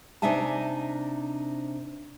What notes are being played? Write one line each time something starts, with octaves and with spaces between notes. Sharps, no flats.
C3 D4 D#4 E5 G#5 A5